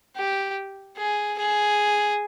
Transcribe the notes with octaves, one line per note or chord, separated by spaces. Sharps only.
G4
G#4
G#4